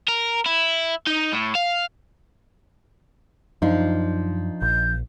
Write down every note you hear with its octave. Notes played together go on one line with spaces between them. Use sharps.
A#4
E4
D#4
A2
F5
F#2 F3 D4 D#4 F4
A#1 G6